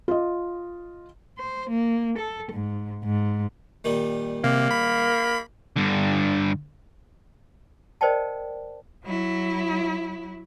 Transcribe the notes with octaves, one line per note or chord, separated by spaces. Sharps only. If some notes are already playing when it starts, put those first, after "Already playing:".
F4 D#5
C5
A#3
A4
G#2
G#2
A#2 D#3 G3
C3 A#3
B5
G2 D3
A#4 C5 D5 D#5 G5 A5
F#3 E4